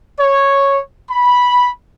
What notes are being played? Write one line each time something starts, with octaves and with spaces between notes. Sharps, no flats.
C#5
B5